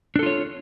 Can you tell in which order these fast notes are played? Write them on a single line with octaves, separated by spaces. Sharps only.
D4 A4 F4 C#5